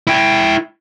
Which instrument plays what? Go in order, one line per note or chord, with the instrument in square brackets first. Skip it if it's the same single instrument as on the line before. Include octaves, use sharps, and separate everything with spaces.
[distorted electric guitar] E4 G5